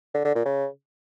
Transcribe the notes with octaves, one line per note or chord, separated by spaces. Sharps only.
D3
D3
A#2
C#3